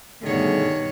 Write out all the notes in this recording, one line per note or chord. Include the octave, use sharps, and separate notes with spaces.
G2 B2 D3 D#3 A3 G#4 C#5